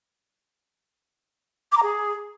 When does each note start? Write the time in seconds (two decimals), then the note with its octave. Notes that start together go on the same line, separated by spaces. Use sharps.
1.72 D6
1.77 A#5
1.83 G#4